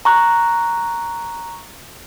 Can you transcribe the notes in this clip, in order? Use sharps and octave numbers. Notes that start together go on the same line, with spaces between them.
A#5 C#6 F#6